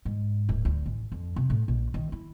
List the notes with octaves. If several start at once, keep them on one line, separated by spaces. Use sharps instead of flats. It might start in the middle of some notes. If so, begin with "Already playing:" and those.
G#2
D1
D2
A1
F2
C3
A2
A#1
D#3
E4